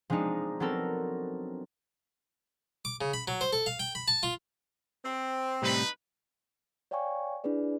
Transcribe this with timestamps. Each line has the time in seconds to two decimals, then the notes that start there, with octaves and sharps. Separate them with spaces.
0.10 F3 G#3 C4 D4 D#4
0.60 F#3 B3 C4 A4 A#4
2.85 D6
3.01 C#3
3.14 B5
3.28 F#3
3.41 C5
3.53 A4
3.66 F5
3.79 G5
3.95 B5
4.08 A5
4.23 F4
5.03 C4
5.62 A2 C3 G3 D#4 B4
6.91 C#5 D5 F5 G5 G#5 C#6
7.44 D4 E4 G#4 B4 D5